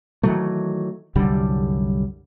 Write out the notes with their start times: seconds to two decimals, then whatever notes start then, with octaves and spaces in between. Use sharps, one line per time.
0.23 D#3 E3 F#3 A3
1.15 C2 F#2 D3 G3